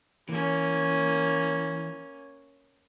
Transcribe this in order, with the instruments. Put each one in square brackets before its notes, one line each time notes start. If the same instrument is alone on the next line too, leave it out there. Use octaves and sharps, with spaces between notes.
[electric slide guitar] E3 [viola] A#3 C#4